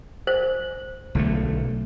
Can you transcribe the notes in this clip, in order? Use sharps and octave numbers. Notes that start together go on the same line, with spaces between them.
C5
B1 D3 A3